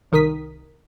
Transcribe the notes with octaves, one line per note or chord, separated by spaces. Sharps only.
C2 D#3 A#4 D#6 B6